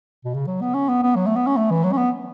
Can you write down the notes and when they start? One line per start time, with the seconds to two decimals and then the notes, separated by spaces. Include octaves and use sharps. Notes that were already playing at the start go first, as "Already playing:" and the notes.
0.25 B2
0.34 C#3
0.47 F#3
0.61 B3
0.74 C#4
0.88 B3
1.02 B3
1.15 F#3
1.26 A3
1.36 B3
1.47 C#4
1.56 A3
1.70 E3
1.83 F#3
1.92 C#4
1.97 B3